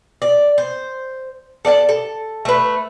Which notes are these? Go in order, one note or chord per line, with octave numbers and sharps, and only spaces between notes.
D5
C5
A4 D5 F#5 A5
A4
A3 B4